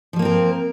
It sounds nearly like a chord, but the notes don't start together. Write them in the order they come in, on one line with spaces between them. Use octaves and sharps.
F3 G3 A#3 C4 A#4